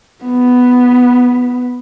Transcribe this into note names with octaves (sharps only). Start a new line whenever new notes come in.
B3